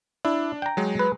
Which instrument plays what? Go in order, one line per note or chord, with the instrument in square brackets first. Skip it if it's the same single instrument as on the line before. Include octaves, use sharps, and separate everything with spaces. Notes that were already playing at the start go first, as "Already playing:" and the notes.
[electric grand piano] D4 [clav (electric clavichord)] E4
[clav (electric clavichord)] G5 A#5
[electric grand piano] F#3 G#3
[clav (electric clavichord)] B4